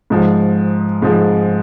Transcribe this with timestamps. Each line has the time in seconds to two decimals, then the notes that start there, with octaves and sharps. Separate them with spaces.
0.10 G#2 F3 G#3
1.02 G#2 F3 G#3